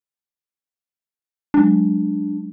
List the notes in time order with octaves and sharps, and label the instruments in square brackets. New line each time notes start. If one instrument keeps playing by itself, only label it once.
[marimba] F#3 G#3 [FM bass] D4